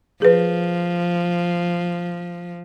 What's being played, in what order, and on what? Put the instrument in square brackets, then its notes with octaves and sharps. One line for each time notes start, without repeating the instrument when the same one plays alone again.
[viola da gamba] F3 [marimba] G#4 B4